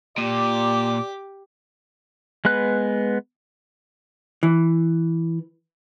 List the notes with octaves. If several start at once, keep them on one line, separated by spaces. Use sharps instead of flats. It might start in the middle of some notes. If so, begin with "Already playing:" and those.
A#2 G4 D5 D6
G#3 B3 B4 F#6
E3